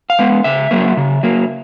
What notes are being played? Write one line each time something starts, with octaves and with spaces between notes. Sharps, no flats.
F5
G#3 B3
C#3 E5
F#3 A#3
C#3
F#3 A#3